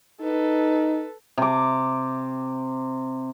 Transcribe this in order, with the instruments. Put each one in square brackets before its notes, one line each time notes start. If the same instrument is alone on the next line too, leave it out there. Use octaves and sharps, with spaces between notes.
[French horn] D#4 [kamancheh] A4 B4
[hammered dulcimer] C3 D6